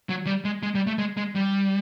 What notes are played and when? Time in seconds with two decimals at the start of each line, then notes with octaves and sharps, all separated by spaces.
0.09 F#3
0.26 G3
0.45 G#3
0.63 G#3
0.75 G3
0.87 A3
0.99 G#3
1.17 G#3
1.35 G3